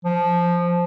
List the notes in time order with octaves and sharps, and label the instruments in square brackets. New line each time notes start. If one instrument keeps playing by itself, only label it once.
[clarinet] F3